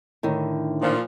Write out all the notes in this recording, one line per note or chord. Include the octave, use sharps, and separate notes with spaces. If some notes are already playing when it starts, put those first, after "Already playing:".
A2 D3 D#3
A#2 F3